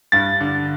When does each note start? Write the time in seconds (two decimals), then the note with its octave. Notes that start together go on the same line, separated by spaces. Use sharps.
0.12 G2 A6
0.40 D3